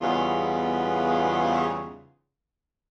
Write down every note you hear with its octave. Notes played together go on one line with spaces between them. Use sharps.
E2 G#2 C#3 G3 B3 F4